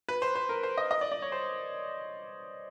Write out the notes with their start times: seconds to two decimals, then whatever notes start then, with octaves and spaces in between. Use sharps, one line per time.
0.09 B4
0.22 C5
0.35 C5
0.49 A#4
0.63 C5
0.78 D#5
0.91 D#5
1.01 D5
1.12 D5
1.22 C#5
1.32 C5